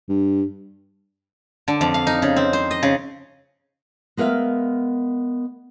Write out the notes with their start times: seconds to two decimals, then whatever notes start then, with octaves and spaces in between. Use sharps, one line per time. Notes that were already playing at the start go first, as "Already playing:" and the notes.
0.09 G2
1.68 D3
1.81 F2
1.94 F5
2.07 D#4
2.22 C#3
2.36 C4
2.53 C5
2.71 D#5
2.83 C#3
4.17 G#3 B3 A#4 C5 E5 F5